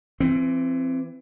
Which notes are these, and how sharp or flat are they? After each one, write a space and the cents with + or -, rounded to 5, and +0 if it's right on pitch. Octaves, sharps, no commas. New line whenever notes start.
E3 +25 C4 +0